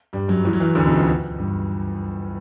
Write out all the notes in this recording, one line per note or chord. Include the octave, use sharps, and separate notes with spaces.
G2 G3
F#2 F#3
E2 E3
F#3
E2 E3
D2 D3
B2
C#2 C#3
G2